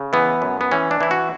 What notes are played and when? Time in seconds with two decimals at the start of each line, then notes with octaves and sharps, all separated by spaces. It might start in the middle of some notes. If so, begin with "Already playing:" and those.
Already playing: C#3
0.13 E3 B3
0.42 F#2
0.61 B3
0.72 E3 C#4
0.91 D4
1.01 E3 E4
1.11 F#4